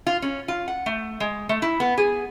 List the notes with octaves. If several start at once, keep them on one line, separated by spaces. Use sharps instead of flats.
F4
C#4
F4
F#5
A3
G#3
A3
E4
B3
G#4